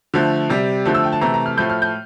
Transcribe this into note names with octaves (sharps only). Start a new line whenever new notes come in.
D3 F3 A3
C3 G3
D3 F3 A3
E6
G5
A5
C3 E3 A3 A#5
A#5
F6
A2 F3 A3 G6
F6
G6